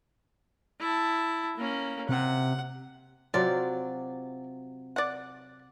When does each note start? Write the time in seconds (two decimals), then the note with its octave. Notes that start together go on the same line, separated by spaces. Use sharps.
0.80 E4 A5
1.57 A#3 C#4
2.09 C3 F#5
3.34 C3 F#3 F4 D5
4.96 D5 F#5